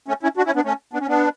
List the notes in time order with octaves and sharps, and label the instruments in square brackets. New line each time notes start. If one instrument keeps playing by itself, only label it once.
[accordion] A3 C#4
C#4 E4
D4 F#4
C#4 E4
B3 D4
A3 C#4
B3 D4
C#4
B3 D4